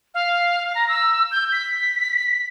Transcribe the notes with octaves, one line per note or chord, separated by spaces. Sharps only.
F5
A#5
E6
G6
B6